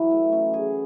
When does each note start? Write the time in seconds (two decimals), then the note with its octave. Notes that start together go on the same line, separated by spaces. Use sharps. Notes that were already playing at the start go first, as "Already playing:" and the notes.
Already playing: E3 F#3 E4
0.11 A3
0.32 C#4
0.53 G#4